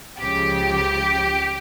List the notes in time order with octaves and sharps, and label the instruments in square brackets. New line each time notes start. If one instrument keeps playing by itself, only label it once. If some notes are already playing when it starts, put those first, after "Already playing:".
[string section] C#2 C#3 F3 G4